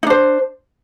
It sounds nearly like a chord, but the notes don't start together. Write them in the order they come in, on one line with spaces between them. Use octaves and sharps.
D#4 D4 C5